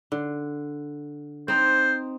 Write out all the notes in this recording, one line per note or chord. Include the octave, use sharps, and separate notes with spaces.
D3
C4 D#4 C5